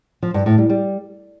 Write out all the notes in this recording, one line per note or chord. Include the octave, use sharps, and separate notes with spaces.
F3
G2
A2
G3
G3